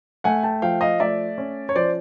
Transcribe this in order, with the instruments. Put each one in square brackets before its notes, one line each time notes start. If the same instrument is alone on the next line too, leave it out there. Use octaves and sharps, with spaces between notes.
[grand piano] A3 F#5 G#5
G5 A5
F3 F5 G5
D#5 F5
A3 D5 E5
C#4
C#5
F3 C5 D5